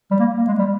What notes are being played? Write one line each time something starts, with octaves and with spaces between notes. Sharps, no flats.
G3
A#3
A#3
G#3
G3